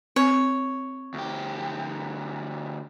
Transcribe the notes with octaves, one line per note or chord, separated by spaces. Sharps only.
C4 C#5
D2 G4